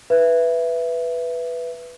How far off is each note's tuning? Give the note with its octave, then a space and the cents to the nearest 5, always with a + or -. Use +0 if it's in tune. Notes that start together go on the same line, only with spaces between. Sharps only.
B4 +0 E5 +15